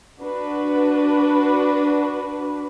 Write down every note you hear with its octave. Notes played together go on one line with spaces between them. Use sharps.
D4 F#4 B4